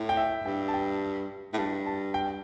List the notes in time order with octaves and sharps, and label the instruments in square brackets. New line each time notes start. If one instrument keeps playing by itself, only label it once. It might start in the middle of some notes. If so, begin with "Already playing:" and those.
Already playing: [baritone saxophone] A2
[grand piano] G5
E5
[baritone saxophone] G2 [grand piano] G5
[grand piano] A5
G5
[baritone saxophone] A2
[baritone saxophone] G2 [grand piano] A5
[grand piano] A5
G5